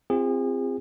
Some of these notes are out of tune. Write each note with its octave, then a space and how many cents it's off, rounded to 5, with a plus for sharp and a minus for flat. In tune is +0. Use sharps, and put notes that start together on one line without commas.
C4 +0 F4 -15 G#4 -35